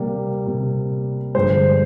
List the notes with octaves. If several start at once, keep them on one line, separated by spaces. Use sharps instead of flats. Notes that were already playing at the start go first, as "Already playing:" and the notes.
Already playing: C3 G3 A#3
C3 G3 A#3
G2 D3 F3 G#3 C5